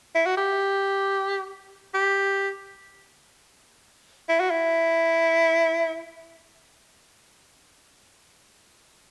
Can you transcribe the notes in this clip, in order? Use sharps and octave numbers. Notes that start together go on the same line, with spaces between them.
E4
F#4
G4
G4
E4
F#4
E4